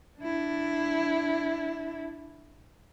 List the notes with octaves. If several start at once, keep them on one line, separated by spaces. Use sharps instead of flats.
D4 E4